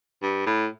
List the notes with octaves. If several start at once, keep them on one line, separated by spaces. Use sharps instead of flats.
G2
A2